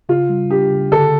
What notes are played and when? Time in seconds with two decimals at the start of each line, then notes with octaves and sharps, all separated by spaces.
0.09 C#3 F4
0.29 G3
0.50 D4 G4
0.71 C#3
0.92 D3 A4